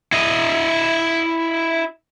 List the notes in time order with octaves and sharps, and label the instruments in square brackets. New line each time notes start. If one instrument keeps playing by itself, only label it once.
[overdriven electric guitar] E4 D#5